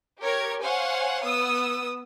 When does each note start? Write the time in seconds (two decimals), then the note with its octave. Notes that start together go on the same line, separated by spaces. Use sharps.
0.20 G4 A#4 C#5 G#6
0.62 C5 C#5 F5 F#5 G#5
1.22 B3 D#6 E6